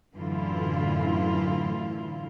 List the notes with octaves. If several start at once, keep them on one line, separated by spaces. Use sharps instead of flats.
F#2 A2 D3 E3 E4 F4